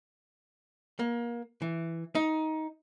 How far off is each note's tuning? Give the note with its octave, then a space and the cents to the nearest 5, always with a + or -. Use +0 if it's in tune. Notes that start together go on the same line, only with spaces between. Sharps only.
A#3 +25
E3 +5
D#4 +15